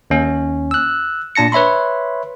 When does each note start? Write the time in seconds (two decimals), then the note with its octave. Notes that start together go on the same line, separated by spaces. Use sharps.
0.10 D#2 C#4
0.71 E6 F#6
1.35 A#2 D4 A5 A#6 C#7
1.52 B4 C#5 E5 B5 C6